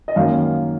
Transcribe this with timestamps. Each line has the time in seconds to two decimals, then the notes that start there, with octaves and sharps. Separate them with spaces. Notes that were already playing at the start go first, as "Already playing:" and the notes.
0.08 D#5
0.16 F#2 D#3 A#3 F5